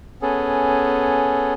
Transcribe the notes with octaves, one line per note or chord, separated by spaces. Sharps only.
B3 C#4 G#4 A4